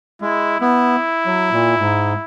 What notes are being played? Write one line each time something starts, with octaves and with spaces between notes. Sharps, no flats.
G#3 E4
B3 E4
F#3
A#2
G#2